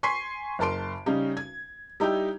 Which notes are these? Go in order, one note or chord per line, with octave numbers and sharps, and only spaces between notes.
G#5 C6 C#6 B6 C7
F#1 A#4 A5 C6 D7
C#3 G3 C#4 D#4
G#6
G3 D#4 E4 G4